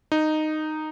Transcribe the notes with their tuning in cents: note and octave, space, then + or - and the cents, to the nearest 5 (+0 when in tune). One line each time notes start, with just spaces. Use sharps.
D#4 -10